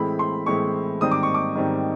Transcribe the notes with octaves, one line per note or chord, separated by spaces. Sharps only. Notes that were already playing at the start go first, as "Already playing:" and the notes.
Already playing: A2 E3 G#3 C4 E4 B5
C6
A2 E3 G#3 C4 E4 C#6
G#2 D#3 G3 C4 D#6
D6
C#6
D6
G#2 D#3 G3 C4